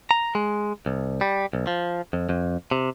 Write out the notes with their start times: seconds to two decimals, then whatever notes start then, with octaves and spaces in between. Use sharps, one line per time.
0.11 A#5
0.35 G#3
0.86 C2
1.21 G3
1.53 B1
1.67 F3
2.13 F2
2.29 F2
2.71 C3